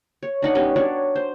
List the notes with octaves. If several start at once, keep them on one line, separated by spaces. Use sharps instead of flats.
C#5
D4 D#4 F#5
G3 B3 C#4 D#4
F#3 D4 C#5 D5
C5